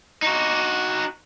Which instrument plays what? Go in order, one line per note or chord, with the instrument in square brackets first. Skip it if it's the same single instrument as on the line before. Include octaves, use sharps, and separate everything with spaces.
[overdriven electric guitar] D#4 F#4